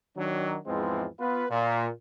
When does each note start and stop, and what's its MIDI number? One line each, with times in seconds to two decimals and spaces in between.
0.17 0.57 51
0.17 0.57 54
0.17 0.57 62
0.66 1.06 40
0.66 1.06 44
0.66 1.06 52
0.66 1.06 53
0.66 1.06 56
0.66 1.06 60
1.19 1.45 59
1.19 1.45 65
1.19 1.45 71
1.50 1.88 46